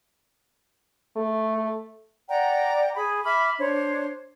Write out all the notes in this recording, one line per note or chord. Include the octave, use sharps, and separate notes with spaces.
A3
D5 F#5 G5 A#5
G#4 B5
E5 B5 D6 F6
D4 C5 C#5